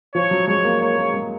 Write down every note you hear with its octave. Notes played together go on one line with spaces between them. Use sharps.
F3 C#5
F#3
G#3 C#5
A#3
A#3 C#5
A#3
G#3